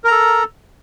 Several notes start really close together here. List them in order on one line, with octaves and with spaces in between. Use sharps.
A#4 A#5 A4